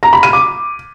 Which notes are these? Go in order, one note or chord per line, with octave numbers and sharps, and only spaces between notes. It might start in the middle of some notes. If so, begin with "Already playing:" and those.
A#5
B5
D#7
D6